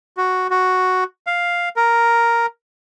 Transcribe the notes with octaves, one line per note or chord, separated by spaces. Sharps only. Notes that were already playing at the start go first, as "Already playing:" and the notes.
F#4
F#4
F5
A#4